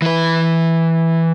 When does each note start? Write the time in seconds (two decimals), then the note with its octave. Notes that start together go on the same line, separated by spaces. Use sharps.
0.02 E3 B4